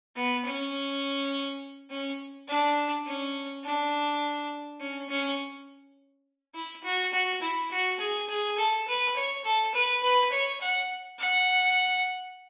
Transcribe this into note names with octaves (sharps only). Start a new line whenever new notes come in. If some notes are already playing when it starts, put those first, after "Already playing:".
B3
C#4
C#4
D4
C#4
D4
C#4
C#4
E4
F#4
F#4
E4
F#4
G#4
G#4
A4
B4
C#5
A4
B4
B4
C#5
F#5
F#5